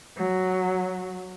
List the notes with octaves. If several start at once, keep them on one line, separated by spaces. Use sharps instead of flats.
F#3